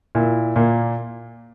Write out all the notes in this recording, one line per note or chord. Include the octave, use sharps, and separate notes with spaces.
A#2 E4
A#2 A#3